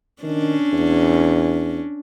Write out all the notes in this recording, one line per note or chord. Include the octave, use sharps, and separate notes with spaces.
D#3 C#4 D4
E2